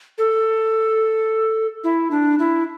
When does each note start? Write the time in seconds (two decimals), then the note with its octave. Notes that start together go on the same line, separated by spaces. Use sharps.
0.18 A4
1.84 E4
2.11 D4
2.39 E4